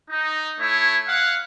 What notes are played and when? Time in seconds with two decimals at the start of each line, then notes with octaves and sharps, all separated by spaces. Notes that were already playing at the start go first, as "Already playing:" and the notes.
0.10 D#4
0.61 A3 E4 C#5
1.08 F5 F#5